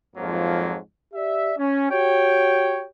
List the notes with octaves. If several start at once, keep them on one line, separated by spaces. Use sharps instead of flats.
F2 G#2 F3 F#3 A#3
G4 D5 E5
C#4
F#4 G4 C#5 G5